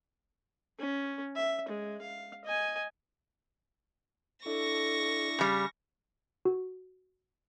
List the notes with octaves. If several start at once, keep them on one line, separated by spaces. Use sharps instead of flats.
C#4
E5
G#3
F5
D#5 G#5
D4 E4 A4 C#6 A#6
C#3 G3
F#4